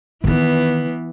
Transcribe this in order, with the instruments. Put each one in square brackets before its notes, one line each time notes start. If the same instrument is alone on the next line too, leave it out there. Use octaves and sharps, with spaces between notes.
[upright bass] D#3 D#4 [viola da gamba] E3 B3